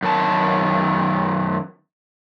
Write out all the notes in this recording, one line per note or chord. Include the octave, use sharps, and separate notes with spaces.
F#2 D#3 A5